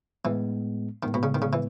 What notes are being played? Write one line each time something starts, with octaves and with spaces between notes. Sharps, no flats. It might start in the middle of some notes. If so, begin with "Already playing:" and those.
A2 E3 G#3 B3
A2 D#3 G#3 B3
B2
C#3
D#3
C#3
E3